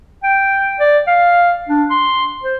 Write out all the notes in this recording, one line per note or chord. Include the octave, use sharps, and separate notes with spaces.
G5
D5
F5
D4
C6
C5